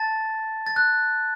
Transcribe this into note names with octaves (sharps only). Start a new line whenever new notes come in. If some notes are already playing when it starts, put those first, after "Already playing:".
Already playing: A5 A6
A6
F#6